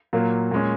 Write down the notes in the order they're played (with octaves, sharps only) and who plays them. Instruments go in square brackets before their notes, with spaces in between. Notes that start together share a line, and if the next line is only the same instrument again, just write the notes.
[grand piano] A#2 F#3 A#3
A#2 G#3 C#4